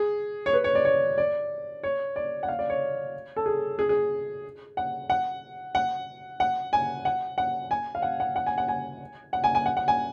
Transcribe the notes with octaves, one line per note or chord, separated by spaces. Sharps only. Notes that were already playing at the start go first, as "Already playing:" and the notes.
Already playing: G#4
C#5
B4
C#5
D5
C#5
D5
C#5
D5
F#5
F5
D5
C#5
A4
G#4
G#4
G#4
F#5
F#5
F#5
F#5
G#5
F#5
F#5
G#5
F5
F#5
F#5
F#5
G#5
F#5
G#5
F#5
G#5
G#5
F#5
F#5
G#5